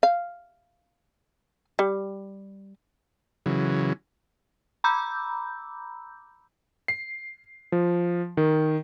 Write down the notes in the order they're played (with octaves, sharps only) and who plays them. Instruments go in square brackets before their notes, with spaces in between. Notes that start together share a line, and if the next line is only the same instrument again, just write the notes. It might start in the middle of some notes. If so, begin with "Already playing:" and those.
[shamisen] F5
G3
[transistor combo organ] C#3 E3 F#3
[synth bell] A#5 B5 D6 E6 G6
[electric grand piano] C7
F3
D#3